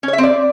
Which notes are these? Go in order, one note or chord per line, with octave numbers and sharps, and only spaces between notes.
C#4
C#5
E5
C4
D5